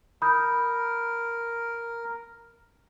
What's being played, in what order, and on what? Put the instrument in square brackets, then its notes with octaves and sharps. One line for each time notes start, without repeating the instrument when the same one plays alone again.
[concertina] A#4 [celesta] B5 D#6 G6